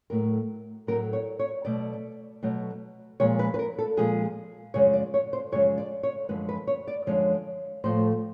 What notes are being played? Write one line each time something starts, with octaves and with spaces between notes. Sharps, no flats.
A2 F#3 A3 A#4
A2 F#3 A3 A#4
C#5
C#5
B2 F#3 A3 D5
B2 F#3 A3
A#2 F3 G#3 C#5
B4
B4
A#4
A4
A#2 F3 G#3 G#4
F#2 C#3 F3 G#3 C#5
D5
C#5
C5
F#2 C#3 F3 G#3 C#5
D5
C#5
F#2 D3 F3 G#3 B4
B4
C#5
D5
F#2 D3 F3 G#3 C#5
A2 F3 A3 C5